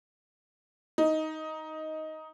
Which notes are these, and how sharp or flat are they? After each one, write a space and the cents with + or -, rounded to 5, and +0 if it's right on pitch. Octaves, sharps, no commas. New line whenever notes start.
D#4 +10